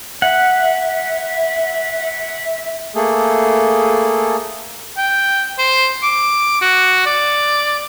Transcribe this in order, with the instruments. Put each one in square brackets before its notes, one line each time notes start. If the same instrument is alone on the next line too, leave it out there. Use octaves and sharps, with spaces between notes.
[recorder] E5 [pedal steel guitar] F#5
[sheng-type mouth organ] A3 A#3 G#4 A4
[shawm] G5
C5
D6
F#4
D5